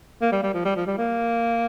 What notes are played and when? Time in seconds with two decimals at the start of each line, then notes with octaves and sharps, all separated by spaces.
0.22 A#3
0.32 G3
0.43 G3
0.54 F3
0.65 G3
0.76 F3
0.87 G3
0.98 A#3